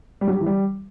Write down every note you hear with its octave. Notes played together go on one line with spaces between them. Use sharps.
G3
F#3
G4
E3
G3